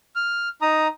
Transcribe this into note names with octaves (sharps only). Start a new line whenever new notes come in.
F6
D#4 A#5 D#6